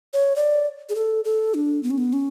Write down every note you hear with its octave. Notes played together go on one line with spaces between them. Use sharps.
C#5
D5
G#4
A4
A4
D4
B3
C#4
B3
C#4